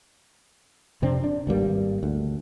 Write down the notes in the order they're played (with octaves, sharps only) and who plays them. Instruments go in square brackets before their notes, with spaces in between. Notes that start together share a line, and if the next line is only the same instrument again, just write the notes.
[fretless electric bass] F2 C3 C4 D4
D4
G#1 G2 G3 A#3
D2